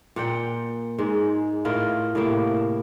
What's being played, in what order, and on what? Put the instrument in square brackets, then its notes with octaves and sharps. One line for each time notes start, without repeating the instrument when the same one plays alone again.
[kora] A#2 F#5 G5
G#2 G#3
A2 E4 F4 A#4
A2 C3 A#3 E4